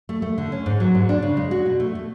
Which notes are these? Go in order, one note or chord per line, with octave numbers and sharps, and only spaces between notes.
A3
A3
D3
C#4
G#2
F#3
G#2
D4
C#3
G#3
F#4
B2
A3
A3